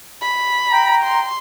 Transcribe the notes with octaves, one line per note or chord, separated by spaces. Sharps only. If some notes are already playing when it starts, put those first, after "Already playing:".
B5
G5 A#5
C6